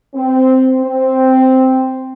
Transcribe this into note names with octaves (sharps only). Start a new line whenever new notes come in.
C4
C4